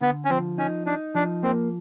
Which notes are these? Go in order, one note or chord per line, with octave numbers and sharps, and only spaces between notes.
D3 B3
C#4
F3 C4
C#4 D#4
D4 D#4
F3 D4
A#3 C4